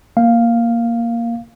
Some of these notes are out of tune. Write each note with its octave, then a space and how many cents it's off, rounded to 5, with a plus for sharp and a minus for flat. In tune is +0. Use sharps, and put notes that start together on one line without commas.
A#3 +0 F5 +0